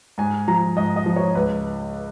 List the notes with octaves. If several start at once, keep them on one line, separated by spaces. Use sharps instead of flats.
G#2 G#5
F3 A#5
G#2 D#5
D#5
F3
C#5
C#2 B4